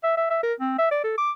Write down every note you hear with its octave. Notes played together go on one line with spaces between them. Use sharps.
E5
E5
E5
A#4
C4
E5
D5
A4
D6